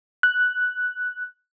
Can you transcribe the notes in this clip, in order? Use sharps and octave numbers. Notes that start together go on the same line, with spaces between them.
F#6